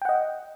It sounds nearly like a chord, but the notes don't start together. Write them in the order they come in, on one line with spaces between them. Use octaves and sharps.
G5 F#5 D#5